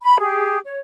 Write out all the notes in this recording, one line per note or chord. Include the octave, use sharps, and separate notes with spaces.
B5
G4 G#4
C#5